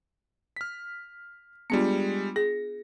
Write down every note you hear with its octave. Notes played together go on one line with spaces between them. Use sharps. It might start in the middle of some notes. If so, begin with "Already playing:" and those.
F6 B6
G3 G#3 B3 D4 F4 C#7
G#4 A#6